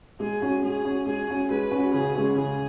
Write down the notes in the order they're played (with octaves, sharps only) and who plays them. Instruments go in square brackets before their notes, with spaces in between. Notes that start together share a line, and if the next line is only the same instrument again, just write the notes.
[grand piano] G#3 [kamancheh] G#4
[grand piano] C#4 F#4
[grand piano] G#3 [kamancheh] G#4
[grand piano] C#4 F#4
[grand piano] G#3 [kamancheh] G#4
[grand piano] C#4 F#4
[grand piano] G#3 [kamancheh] B4
[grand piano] C#4 F#4
[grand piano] C#3 [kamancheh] G#4
[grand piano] G#3 C#4
[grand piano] C#3 [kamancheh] G#4